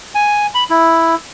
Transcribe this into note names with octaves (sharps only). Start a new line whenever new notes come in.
G#5
B5
E4